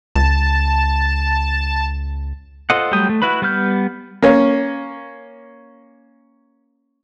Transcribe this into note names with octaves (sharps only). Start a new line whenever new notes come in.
C#2 A5
F4 A4 C5 D#5 F#5
F#3 G3 A3 G5 D#6
A3
E4 F#4 B4 B5
G3 B3 B4 F6 G6
A#3 C#4